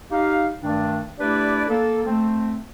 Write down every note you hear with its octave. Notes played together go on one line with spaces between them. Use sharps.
D#4 G4 F5
G2 D#3 A3 D4
A3 D4 E4 G4 B4 D5
A#3 A4
A3 C4